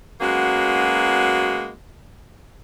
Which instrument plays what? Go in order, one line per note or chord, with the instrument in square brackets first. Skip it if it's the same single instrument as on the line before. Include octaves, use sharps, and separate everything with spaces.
[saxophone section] F#3 G#3 A#3 B3 C#4 F#4